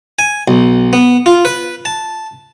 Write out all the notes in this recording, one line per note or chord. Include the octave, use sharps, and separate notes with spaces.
G#5
B1
B3
F4
B4
A5